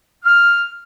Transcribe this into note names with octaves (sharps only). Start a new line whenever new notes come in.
F6